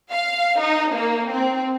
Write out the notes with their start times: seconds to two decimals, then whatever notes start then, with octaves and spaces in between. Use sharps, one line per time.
0.12 F5
0.60 D#4
0.94 A#3
1.31 C4